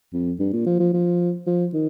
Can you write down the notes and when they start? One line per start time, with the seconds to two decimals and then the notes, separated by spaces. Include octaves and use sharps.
0.13 F2
0.39 G2
0.53 A#2
0.66 F3
0.79 F3
0.94 F3
1.47 F3
1.73 D#3